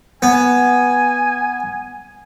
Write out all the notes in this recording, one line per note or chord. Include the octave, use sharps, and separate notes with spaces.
B3 G#5